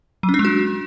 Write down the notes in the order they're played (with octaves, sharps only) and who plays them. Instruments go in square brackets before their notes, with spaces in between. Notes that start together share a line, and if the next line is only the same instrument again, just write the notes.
[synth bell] F#3
C#4
D4
G#3
F#4